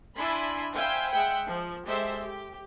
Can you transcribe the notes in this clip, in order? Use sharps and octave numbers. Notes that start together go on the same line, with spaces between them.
D4 E4 E5 G#5 B5 C6
C5 E5 F5 G5 G#5 B5
G#3 E5 F#5 G5
F3
G#3 G4 A4 C5 E5
G4